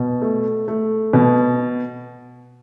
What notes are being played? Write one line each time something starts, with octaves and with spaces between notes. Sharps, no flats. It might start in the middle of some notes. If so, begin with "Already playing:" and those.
Already playing: B2
A3
A3
B2